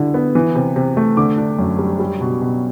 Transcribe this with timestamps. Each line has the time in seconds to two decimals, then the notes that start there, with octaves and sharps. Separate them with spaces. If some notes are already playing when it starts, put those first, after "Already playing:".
Already playing: D3 G3 E4
0.14 B3
0.35 E3
0.55 C3
0.76 C3
0.97 A3
1.17 D3 D6
1.38 D4
1.59 F#2
1.79 G3
1.99 G3
2.21 B2
2.41 B2